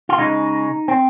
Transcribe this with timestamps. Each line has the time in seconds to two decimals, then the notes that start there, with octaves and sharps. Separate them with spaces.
0.09 F4
0.18 C#3 G#3 D#4
0.88 C4